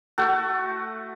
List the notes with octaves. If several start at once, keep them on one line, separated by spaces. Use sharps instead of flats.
A3 F#4